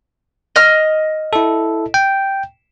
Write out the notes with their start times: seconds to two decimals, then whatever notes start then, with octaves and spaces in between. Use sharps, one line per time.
0.56 D#5 F6
1.33 E4 A4
1.94 G5